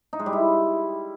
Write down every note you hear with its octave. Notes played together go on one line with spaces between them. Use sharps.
D#4
G#3
G3
E4